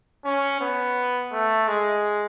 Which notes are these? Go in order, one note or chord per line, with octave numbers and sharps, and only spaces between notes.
C#4
B3
A3
G#3